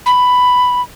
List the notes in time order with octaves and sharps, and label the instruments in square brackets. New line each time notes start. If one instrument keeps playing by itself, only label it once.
[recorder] B5